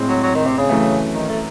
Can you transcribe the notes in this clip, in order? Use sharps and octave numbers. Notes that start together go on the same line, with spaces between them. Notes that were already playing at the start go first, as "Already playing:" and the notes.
Already playing: A2 G#3 C4
F#3
F#3
D#3
C3
C#3
F#2 E3 A3
D#3
A3